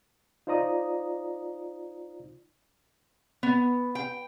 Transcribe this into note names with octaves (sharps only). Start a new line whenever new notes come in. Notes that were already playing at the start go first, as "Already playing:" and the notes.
D#4 F4 C5 D5 A#5 D#6
B3
G5